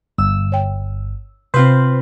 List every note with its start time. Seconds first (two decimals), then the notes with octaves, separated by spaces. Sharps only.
0.18 G1 E6
0.52 C#5 G5
1.54 C3 C4 F4 B4 C5